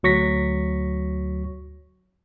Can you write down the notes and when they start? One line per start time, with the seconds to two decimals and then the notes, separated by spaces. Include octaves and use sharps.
0.03 D2 F#3 C#6 A#6 B6